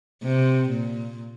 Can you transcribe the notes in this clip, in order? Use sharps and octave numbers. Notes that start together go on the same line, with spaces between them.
C3
A#2